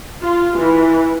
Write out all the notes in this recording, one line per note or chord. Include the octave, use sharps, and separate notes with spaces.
F4
E3